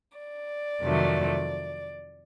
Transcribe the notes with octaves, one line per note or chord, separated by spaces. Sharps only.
D5
F2 C3 D#3 F#3 A3